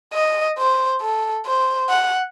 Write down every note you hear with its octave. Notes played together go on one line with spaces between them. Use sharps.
D#5
C5
A4
C5
F#5